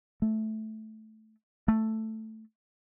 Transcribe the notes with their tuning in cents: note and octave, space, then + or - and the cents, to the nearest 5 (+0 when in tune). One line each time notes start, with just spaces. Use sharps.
A3 -10
A3 +5